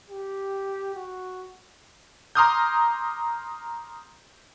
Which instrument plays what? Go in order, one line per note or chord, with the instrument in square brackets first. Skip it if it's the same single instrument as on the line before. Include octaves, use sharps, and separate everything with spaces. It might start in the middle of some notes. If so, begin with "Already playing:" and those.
[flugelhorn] G4
F#4
[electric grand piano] A#5 C6 D6 D#6 F6 G6